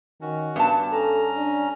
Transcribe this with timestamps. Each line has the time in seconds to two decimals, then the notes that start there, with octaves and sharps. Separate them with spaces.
0.21 D#3 C#4 F#4
0.56 G2 B3 A5
0.92 C#4 A4 A#5
1.37 D4